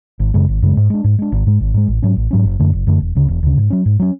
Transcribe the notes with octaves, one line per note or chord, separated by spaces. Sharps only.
G#1
F#2 C#3 G#3
G#1
F#2 C#3 G#3
G#2
G#3 D4
G#2
G#3 D4
G#1
G#2 G#3
G#1
G#2 G#3
A1
G#2 F#3 C#4
A1
G#2 F#3 C#4
F#1
F#2 D3 A3
F#1
F#2 D3 A3
E1
D2 C#3
E1
D2 C#3
G#2
F#3 C#4
G#2
F#3 C#4